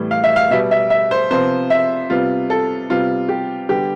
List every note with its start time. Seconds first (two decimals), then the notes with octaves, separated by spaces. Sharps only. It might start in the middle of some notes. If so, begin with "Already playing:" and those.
Already playing: A2 E3 G3 B3
0.11 F5
0.24 E5
0.36 F5
0.51 B2 G3 B3 E5
0.71 E5
0.90 E5
1.11 C5
1.31 C3 F3 B3 C5
1.70 E5
2.10 C3 G3 B3 F4
2.50 A4
2.90 C3 G3 B3 F4
3.29 G4
3.69 D3 G3 B3 G4